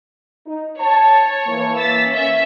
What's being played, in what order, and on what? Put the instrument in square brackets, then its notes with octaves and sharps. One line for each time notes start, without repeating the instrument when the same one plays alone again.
[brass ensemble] D#4
[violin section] C#5 [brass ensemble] A5
[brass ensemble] E3 A#3
[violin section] E6 A6 B6
C#4 E5